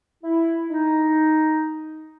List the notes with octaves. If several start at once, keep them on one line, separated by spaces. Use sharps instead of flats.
E4
D#4